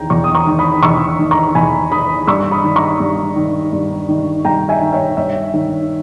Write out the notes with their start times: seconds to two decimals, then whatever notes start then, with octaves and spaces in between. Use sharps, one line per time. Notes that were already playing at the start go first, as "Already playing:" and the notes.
Already playing: E2 D#3 G5 A#5
0.10 E2 A#5 C#6
0.24 D#6
0.35 A#5 C#6
0.47 D#3
0.58 B5 D#6
0.83 E2 C#6 E6
1.19 D#3
1.31 A#5 C#6
1.55 E2 G#5 B5
1.91 D#3 B5 D#6
2.27 G2 C#6 E6
2.51 B5 D#6
2.64 D#3
2.76 A#5 C#6
3.00 G2
3.36 D#3
3.73 G2
4.09 D#3
4.45 G2 G5 A#5
4.69 E5 G#5
4.81 D#3
4.93 C#5 E5
5.17 G2 C#5 E5
5.54 D#3